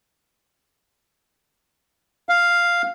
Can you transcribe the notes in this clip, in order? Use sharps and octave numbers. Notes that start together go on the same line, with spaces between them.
F5